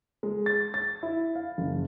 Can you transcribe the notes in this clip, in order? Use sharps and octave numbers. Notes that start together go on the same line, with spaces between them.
G#3
A6
A6
E4
F5
F#1